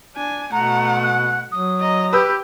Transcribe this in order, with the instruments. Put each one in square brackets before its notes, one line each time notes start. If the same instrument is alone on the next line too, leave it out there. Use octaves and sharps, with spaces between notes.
[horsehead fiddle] D4 G#5
[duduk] B2 [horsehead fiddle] A3 F#5 [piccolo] A#5
[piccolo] F#6
[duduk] F#3 [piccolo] D#6
[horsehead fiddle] D#5 A#5
[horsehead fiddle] G4 [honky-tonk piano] B4 E6 G6